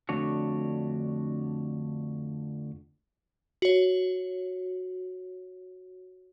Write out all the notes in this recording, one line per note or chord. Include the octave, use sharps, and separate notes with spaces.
F2 D3 A3 D4 F#4 C#5
F#4 C#5